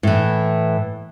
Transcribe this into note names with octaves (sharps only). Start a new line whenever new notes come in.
A2 E3